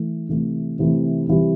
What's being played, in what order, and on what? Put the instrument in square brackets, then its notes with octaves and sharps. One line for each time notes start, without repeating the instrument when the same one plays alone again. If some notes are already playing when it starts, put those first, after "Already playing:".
Already playing: [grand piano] E3 A3
C3 E3 A3
C3 E3 A3
C3 E3 G3